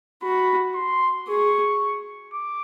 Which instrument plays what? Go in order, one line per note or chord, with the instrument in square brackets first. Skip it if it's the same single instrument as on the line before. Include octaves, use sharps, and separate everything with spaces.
[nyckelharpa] F#4 [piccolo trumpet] B5
[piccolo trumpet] C6
[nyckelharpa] G#4 [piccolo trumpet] C#6
[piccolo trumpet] D6